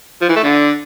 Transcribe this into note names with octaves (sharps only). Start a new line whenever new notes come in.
F3
E3
A3
D3